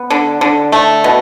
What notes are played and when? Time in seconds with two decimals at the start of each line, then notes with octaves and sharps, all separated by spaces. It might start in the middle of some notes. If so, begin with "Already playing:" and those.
Already playing: B3
0.10 D3
0.41 D3
0.72 A3
1.04 B2